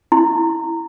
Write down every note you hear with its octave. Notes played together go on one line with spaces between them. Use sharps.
E4